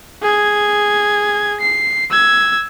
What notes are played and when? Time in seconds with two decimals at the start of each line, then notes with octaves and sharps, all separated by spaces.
0.23 G#4 G#6
1.61 C7
2.11 E6 G#6